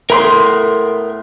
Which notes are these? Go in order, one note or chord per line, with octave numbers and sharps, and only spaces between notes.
A2 B3 A#4 B5 C6